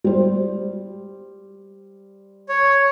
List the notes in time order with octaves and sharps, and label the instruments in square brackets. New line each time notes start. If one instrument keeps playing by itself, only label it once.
[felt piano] G3 C5
[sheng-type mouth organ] C#5